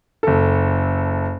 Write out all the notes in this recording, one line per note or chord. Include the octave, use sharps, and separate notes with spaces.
F#1 A4